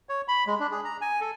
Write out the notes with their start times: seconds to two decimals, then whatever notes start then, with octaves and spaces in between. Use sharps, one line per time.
0.09 C#5
0.28 B5
0.47 G#3
0.60 D4
0.71 G#4
0.85 A#5
1.01 G#5
1.21 A4